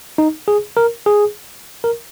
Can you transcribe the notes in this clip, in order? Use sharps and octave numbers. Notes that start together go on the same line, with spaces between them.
D#4
G#4
A#4
G#4
A#4